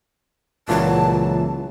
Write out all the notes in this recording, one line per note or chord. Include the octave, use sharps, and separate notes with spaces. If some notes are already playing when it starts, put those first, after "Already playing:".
C#2 A#2 E3 F#3 A5